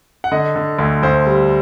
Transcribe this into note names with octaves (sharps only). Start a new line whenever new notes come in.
F#5
D3 D#5
D3
D2
D2 C5
G3